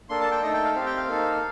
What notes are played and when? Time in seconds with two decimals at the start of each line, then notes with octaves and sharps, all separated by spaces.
0.09 A#3 D4 A4 C6
0.21 A5
0.31 G5
0.42 A3 D#4 A4 D#5
0.53 G5
0.64 F5
0.75 C4 G4 F5
0.86 G5
0.97 F5
1.08 A#3 D#4 A4